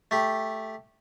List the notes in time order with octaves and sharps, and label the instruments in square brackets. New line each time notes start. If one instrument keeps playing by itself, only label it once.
[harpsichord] A3 G4